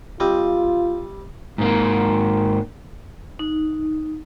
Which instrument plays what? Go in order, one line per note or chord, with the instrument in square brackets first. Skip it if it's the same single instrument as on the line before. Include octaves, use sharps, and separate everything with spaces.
[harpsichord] G3 C4 D#5 [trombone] F4
[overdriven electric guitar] G#2 A#3
[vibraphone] D#4